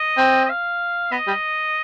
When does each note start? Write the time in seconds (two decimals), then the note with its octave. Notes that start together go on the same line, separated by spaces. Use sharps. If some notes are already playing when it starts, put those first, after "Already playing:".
Already playing: D#5
0.18 C4
0.45 D#5
0.49 F5
1.12 B3 D#5
1.27 G3